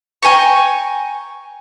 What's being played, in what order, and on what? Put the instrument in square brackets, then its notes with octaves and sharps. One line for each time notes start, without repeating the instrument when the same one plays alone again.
[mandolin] G5 G#5 A#5 C#6